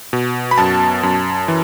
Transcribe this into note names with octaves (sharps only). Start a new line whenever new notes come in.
B2
B5
F#2 A5
F#2
E3